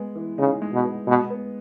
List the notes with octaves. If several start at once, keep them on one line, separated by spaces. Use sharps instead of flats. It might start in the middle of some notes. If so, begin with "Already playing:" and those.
Already playing: G#3 B3
E3
C#3 D#4
G#3
B2
B3
B2 G#3
B3